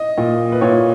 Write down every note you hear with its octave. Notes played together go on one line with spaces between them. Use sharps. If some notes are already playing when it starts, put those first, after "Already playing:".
Already playing: D#5
A#2
B4
A#2 C#5